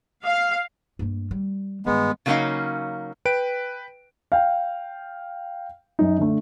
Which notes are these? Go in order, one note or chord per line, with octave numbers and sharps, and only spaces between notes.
F5
G2 A#3
G3
G2 D#3 G#3 B3
C#3 F#3 A#3 C#4 D#4 F5
B4 G5 D7
F5 G5
F#2 D#4
D3 A3